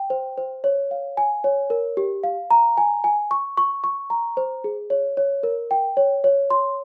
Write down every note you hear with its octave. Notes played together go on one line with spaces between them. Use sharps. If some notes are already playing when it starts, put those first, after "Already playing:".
Already playing: G5
C5
C5
C#5
F5
G#5
C#5
A#4
G4
F5
A#5
G#5
G#5
C#6
C#6
C#6
A#5
C5
G#4
C#5
C#5
A#4
G5
C#5
C#5
C6